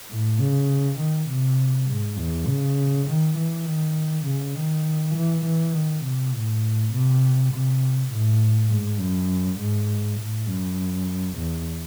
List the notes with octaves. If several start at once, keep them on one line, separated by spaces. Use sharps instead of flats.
A2
C#3
D#3
C3
G#2
E2
C#3
D#3
E3
D#3
C#3
D#3
E3
E3
D#3
C3
A2
C3
C3
A2
G#2
F#2
G#2
A2
F#2
E2